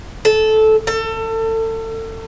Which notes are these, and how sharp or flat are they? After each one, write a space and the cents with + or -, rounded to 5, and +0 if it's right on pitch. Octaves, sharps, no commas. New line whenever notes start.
A4 -15
A4 +30